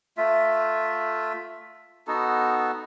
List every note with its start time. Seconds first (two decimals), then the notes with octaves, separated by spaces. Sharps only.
0.17 A3 F4 E5
2.07 B3 D#4 F#4 A4